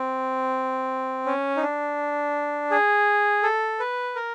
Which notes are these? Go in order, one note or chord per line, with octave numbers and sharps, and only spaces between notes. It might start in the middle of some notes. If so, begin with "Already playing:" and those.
Already playing: C4
C#4
D#4
D4
G#4
A4
B4
A#4